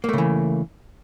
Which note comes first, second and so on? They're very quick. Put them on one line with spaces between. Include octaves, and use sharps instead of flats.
A#3 A3 C#3 E3